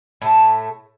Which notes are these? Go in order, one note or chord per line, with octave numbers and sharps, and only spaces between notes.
A2 A3 A5